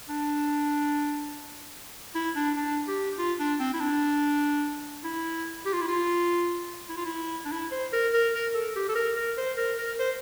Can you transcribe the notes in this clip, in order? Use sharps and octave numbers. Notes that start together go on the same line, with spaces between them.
D4
E4
D4
D4
G4
F4
D4
C4
E4
D4
E4
G4
F4
E4
F4
E4
F4
E4
D4
E4
C5
A#4
A#4
A#4
A4
G4
A4
A#4
A#4
C5
A#4
A#4
C5